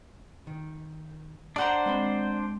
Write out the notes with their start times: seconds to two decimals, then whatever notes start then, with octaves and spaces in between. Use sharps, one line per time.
0.47 D#3
1.56 D4 C5 D5 F#5 A#5
1.86 G#3 C4 B5